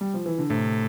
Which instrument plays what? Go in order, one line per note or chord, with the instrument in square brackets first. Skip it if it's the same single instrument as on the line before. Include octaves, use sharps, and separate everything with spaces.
[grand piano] G3
F3
E3
D3
[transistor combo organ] A2 [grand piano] C3